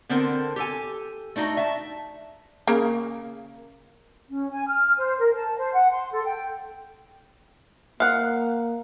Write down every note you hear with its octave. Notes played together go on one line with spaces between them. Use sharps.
D3 B3 C4 A4 A#4 C5
G4 A4 G#5
A3 D4 D#4 F#4
E5 A5
C#3 A#3 A#4
C#4
G#5
F6
C5
A#4
A5
C5
F#5
C6
A4
G5
A#3 F5 F#5